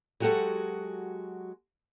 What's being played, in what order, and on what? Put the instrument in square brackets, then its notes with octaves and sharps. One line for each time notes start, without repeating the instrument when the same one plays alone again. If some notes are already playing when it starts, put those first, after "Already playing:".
[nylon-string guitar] F#3 G#3 F#4 G4 A4 F#5